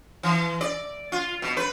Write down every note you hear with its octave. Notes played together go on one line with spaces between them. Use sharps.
E3
D5
F4
B2
B4